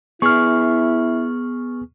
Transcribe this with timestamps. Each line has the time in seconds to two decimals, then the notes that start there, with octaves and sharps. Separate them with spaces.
0.22 B3 E4 G#4 C#6 F6